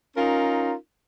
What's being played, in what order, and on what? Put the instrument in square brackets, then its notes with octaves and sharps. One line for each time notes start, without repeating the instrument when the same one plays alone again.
[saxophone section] C#4 D#4 F4 A#4